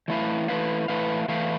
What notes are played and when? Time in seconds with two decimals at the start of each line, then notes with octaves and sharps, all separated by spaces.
0.08 E3 A3 E4 B4 F5
0.48 E3 A3 E4 B4 F5
0.88 E3 A3 E4 B4 F5
1.28 E3 A3 E4 B4 F5